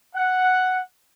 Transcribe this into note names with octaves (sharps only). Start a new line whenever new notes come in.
F#5